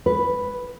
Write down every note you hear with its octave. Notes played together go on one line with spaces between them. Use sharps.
B4